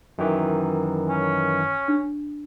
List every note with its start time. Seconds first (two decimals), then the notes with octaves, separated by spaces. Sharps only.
0.18 F#2 D#3 E3
1.09 C#4
1.88 D4